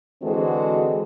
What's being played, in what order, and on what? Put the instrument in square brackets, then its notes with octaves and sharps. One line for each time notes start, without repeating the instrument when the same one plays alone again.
[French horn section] D3 E3 G#3 C4 F#4 A4